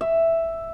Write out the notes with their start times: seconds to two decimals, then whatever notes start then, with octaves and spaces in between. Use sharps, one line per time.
0.01 E5